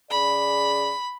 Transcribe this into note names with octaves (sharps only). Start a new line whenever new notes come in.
C#3 G#4 D5 B5